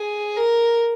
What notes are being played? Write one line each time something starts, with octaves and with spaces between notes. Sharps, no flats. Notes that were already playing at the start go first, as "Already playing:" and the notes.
Already playing: G#4
A#4